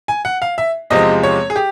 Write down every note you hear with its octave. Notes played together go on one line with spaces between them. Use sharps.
G#5
F#5
F5
E5
E2 C3 F3 G#3 C4 D#5
C#5
G#4
G4